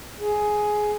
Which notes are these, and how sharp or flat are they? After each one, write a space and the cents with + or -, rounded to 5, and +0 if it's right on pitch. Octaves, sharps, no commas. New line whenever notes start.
G#4 +10